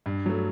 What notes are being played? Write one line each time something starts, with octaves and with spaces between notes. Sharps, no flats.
G2
F#3 A3